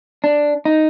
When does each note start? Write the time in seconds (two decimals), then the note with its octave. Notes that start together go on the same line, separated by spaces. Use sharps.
0.24 D4
0.65 D#4